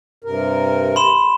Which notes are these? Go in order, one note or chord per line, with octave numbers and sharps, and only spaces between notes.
G2 C3 A#4
B5 C6 E7